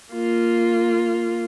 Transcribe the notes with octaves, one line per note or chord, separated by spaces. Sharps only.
A#3 F4